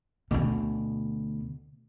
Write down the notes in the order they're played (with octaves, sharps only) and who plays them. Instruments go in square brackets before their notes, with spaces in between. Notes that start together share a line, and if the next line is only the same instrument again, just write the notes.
[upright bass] D2 B2